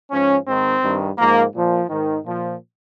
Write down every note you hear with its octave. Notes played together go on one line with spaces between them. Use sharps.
G#2 F3 C#4
G#2 D#3 C4
G2 D#3
G#2 F3 A#3
A#2 F3
G#2 D#3
A#2 F3